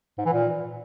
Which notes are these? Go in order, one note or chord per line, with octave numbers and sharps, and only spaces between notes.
G#2
E3
A#2